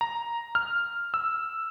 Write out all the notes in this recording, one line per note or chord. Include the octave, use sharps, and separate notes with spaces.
A#5
F6
E6